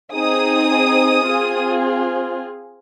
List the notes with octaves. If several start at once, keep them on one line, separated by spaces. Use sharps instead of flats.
C4 D#4 G#4 D#6
C4 F4 G#4